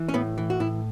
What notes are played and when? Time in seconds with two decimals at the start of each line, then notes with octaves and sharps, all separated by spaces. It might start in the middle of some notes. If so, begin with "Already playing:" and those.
Already playing: E3
0.09 C#4
0.14 A2 B3
0.38 E3
0.50 F#4
0.60 A2 E4